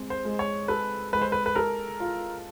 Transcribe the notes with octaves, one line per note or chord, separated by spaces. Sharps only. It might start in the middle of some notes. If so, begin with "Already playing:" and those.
Already playing: G#3 C4
C5
G#3
C#5
A4 B4
G#3 B4
C5
B4
B4
A4 A#4
F4